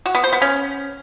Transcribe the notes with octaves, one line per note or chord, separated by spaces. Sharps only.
F#4
B3
C5
B3
C#4